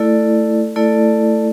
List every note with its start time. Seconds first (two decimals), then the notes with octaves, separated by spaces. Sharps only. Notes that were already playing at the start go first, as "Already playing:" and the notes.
Already playing: A3 E4 A4 D5
0.76 A3 E4 A4 D5